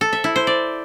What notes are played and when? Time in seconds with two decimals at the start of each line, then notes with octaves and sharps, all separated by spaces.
0.01 A4
0.13 E5
0.24 E4
0.36 C5
0.47 D5